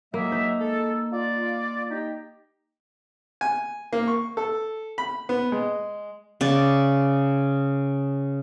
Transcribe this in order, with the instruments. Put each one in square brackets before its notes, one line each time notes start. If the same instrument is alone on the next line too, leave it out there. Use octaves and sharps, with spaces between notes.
[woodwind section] F#3 G#3 E5 [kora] A#3
[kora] D#4
[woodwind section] G#3 A4
F4 D5
D#4 G4
[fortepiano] G#5
A#3
C#6
A4
B5
B3
G#3
[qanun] C#3 D5